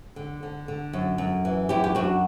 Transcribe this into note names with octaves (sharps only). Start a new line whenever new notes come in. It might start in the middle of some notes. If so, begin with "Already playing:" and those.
D3
D3
D3
F#2
F#2
E3
F#2 E4 G4
G4
F#2 D4 F#4